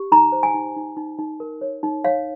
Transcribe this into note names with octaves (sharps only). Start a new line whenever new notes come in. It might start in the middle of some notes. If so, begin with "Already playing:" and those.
Already playing: G4
D#4 A#5
C5
G#5
D#4
D#4
D#4
D#4
A#4
C#5
D#4
C#5 F5